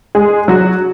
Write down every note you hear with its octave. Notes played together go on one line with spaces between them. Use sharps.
G#3 G#4
F#3 F#4